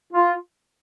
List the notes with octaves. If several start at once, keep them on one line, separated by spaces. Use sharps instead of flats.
F4